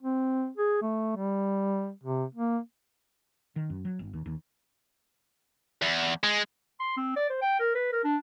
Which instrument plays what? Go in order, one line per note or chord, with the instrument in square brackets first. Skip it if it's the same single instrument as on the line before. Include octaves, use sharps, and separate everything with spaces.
[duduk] C4
G#4
A3
G3
C3
A#3
[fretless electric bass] D#3
F#2
F#3
G1
D#2
D#2
[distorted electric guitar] E2
G#3
[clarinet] C6
C4
D5
C5
G5
A#4
B4
A#4
D4